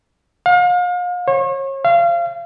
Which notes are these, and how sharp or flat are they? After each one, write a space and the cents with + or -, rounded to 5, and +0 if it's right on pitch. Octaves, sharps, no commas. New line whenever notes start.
F5 +40
C#5 -35
F5 -25